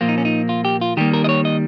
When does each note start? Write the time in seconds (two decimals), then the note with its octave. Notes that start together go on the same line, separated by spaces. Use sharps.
0.01 A#2 F3 A#3 F4
0.09 D#4
0.18 C#4
0.25 D#4
0.49 F4
0.65 G4
0.81 F4
0.97 D#3 G3 A#3 G4
1.14 A#4
1.24 D#5
1.29 C#5
1.45 D#5